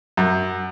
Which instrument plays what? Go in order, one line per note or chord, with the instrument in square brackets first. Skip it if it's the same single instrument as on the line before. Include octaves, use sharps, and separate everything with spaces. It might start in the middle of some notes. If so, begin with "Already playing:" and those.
[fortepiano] F#2